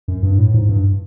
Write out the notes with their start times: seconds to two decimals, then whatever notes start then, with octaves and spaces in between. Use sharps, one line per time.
0.08 F#2
0.23 G2
0.38 A2
0.54 G#2
0.69 G2